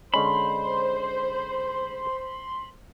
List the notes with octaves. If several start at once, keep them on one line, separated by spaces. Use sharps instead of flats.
D3 G#3 C#4 C5 B5 C6